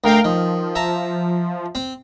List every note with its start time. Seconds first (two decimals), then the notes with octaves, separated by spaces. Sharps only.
0.04 D2 A#4 F5 G5
0.24 D#3 F3
0.75 E5 A5 A#5
1.75 C4